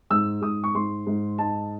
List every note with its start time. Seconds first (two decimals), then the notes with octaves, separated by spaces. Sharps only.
0.10 G#2 E6
0.42 G#2 D#6
0.64 C#6
0.75 G#2 C6
1.07 G#2
1.38 D#4 A5